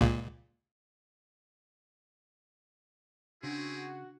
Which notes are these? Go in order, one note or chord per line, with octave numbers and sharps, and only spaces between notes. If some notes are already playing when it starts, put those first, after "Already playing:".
C#2 A#2
C#3 C4 D4 E4 F#4 G#4